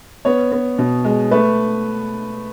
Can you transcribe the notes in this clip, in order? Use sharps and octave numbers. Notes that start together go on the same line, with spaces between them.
B3 C#5
B3
B2
G#3
A3 B4